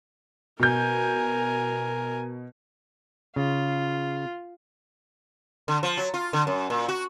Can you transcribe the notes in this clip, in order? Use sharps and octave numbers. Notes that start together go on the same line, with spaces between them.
B2 A#4 G#5 G6
C#3 F4
D3
F3
F#3
F4
D3
F#2
A#2
F#4